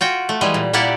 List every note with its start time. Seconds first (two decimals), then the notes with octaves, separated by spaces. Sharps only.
0.01 F4 F#4 G5
0.29 A3
0.41 E3 G3 G#3
0.54 A#2
0.73 A#2 A#3 E4 G4 D5 F#5